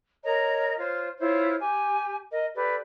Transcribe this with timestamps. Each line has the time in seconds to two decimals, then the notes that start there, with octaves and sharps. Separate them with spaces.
0.24 A#4 C#5 D#5 A#5
0.78 F4 C5 C#5
1.19 E4 F4 C5 C#5
1.59 G4 G#5
2.31 A#4 D#5
2.54 G4 A4 B4 D5